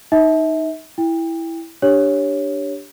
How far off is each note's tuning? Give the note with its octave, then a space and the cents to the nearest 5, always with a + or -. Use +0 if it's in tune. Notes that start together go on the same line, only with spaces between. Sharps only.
D#4 +0 E5 -35
E4 +0 G5 +25
D4 +0 G4 +0 C#5 +0